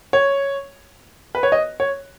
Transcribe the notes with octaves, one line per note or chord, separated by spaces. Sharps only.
C#5
B4
C#5
D#5
C#5